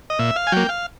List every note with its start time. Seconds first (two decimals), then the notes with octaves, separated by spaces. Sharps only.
0.10 D#5
0.19 A#2 E5
0.36 F5
0.47 G#5
0.52 F#3 A#3 G5
0.69 F5